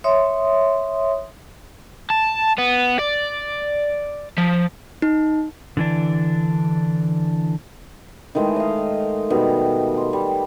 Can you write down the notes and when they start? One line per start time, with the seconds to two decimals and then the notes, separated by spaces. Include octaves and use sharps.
0.04 C#5 E5 C6 D#6
2.10 A5
2.58 B3
2.99 D5
4.38 F3
5.02 D#4
5.77 D3 E3 D4
8.35 D#3 E3 G#3 A3
8.56 D#5 F5
9.30 B2 D#3 G3
9.97 C6
10.13 G3